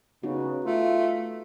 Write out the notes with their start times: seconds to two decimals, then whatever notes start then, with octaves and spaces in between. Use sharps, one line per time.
0.23 C#3 B3 D#4 F#4
0.64 A3 F4